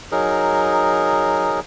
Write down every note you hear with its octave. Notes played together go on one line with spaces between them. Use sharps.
F#3 D#4 G#4 A#4